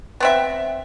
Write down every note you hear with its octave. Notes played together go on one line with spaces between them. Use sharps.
B3 C4 E5